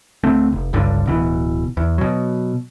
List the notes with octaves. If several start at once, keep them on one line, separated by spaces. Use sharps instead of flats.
D2 A3 C4
F1
G1 C#2 G2 D3
D1 B2 E3
E2
B2 F#3